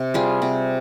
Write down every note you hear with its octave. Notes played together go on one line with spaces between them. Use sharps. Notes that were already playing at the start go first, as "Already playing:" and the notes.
Already playing: C3
G3 F4 G#4
C3